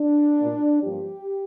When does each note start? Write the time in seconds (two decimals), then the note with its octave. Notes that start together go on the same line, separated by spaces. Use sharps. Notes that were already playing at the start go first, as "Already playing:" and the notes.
Already playing: D4
0.38 A#2 A#3
0.82 G2 F3 A#3 G4